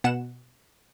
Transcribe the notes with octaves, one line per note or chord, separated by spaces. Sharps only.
B2 F#5 E7